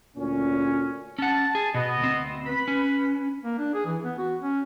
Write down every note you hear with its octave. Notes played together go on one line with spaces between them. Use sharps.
D2 A#2 C#4
C#4 F#5 A5
G#4
B2 B3 D#5
D2 C4
B4 B5
C#4
A#3
D4
G#4
E3
B3
F#4
C#4